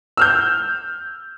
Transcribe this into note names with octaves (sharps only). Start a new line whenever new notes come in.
E6 F6 G6